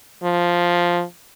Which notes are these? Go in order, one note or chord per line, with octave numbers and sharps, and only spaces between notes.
F3